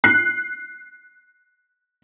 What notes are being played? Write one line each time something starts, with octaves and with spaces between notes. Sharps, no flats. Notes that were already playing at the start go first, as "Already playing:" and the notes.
F#6 C7